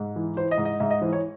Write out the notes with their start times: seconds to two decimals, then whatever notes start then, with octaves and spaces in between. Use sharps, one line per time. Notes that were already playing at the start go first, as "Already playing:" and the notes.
Already playing: G#2
0.16 E3
0.37 E3 C5
0.51 D#5
0.58 G#2
0.65 D#5
0.80 G#2 E5
0.91 D#5
1.01 E3 C5
1.13 C#5